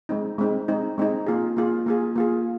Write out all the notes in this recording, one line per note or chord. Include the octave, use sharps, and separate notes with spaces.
G#3 C4 D#4
G#3 C4 D#4
G#3 C4 D#4
G#3 C4 D#4
A#3 F4 G#4
A#3 F4 G#4
A#3 F4 G#4
A#3 F4 G#4